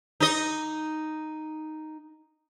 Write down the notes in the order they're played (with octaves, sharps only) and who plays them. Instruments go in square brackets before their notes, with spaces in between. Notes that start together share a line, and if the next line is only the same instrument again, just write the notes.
[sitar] D#4 D#5